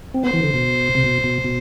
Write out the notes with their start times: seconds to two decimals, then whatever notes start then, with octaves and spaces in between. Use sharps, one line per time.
0.14 C4
0.24 B3 C5
0.34 E3
0.43 D3
0.54 B2
0.95 C3
1.04 B2
1.24 B2
1.44 B2